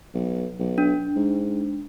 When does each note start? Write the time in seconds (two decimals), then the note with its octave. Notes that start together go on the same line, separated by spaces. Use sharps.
0.14 B1
0.59 B1
0.78 D4
1.16 G#2